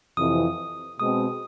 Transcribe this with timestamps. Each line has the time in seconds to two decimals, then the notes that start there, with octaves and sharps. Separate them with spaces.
0.17 F2 C3 E3 D#6
0.99 B2 G#3 C4 D#6